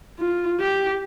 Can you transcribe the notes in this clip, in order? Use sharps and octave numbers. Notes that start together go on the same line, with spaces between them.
F4
G4